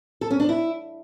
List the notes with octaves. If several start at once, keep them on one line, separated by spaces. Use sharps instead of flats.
A4
C#4
D4
E4